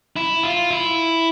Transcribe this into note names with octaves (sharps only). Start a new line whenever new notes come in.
E4
F4
E4